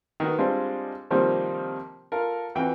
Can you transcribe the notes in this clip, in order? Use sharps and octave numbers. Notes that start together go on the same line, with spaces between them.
D#3 B3 F#4
G3 G#3 C4 D4 F4
C3 D#3 F3 G3 A#3 C4
F4 A4 A#4
F2 E3 F#4 G5